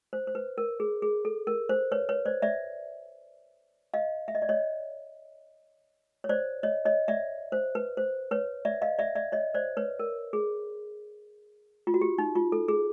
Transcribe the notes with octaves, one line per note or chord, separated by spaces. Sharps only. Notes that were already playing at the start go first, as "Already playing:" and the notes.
C5
C5
B4
A#4
G#4
G#4
A4
A#4
C5
B4 C#5
B4 C#5
C5 D5
D5 E5
D#5 F5
E5
D#5
D5
C#5 D#5
C#5
C5 D5
C#5 D#5
C#5 D#5
D5 E5
C5
B4
C5
B4 C#5
D5 E5
D#5 F5
D5 E5
D5 E5
C#5 D#5
C5 D5
B4 C#5
A#4
G#4
F4
F#4
G4
D#4
F4
A4
G#4